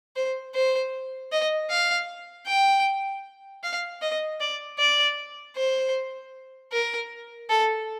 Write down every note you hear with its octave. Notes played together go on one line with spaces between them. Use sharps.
C5
C5
D#5
F5
G5
F5
D#5
D5
D5
C5
A#4
A4